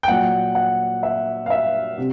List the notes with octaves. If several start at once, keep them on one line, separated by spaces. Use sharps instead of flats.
G5
A#2 F#3 F#5
F#5
E5
F5
E5
C3